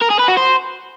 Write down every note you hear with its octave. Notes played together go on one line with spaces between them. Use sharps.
A#4
G#4
B4
F#4
C5